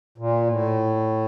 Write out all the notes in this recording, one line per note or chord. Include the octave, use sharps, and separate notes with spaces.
A#2
A2